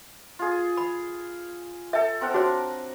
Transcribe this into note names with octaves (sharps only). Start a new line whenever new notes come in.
F4 G#4
B5
A4 E5 G5
C4 A#4 F#5
D4 F#4 C#5 C6